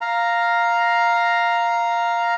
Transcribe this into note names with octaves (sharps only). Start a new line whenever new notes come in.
F5 A#5